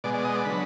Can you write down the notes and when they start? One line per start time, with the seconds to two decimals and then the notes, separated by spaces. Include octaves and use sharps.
0.04 B2 G#3 D5
0.14 D5
0.25 D#5
0.35 D5
0.45 D3 F#3 B4